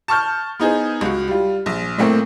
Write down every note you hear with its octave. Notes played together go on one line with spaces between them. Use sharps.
A5 C#6 F6 G6
B3 D#4 G#4 C5
C#2 F#4
G3 F4
A#1
A2 A3 A#3 C4